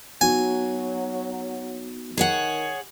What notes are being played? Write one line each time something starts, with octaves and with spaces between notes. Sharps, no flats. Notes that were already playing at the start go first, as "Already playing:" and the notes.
F#3 B3 D#4 F#4 G#5
D#3 G#4 C#5 F#5